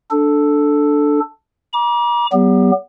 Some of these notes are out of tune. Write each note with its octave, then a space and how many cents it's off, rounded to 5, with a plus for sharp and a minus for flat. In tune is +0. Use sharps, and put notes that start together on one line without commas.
D4 +0 A4 +0
A#5 +40 D6 -10
F#3 +40 B3 +0 G4 +30